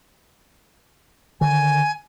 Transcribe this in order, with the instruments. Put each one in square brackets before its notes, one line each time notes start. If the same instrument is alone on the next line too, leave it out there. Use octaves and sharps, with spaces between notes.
[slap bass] D3 D#3 [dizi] G#5